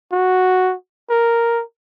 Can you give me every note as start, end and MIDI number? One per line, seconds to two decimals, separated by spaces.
0.12 0.74 66
1.10 1.63 70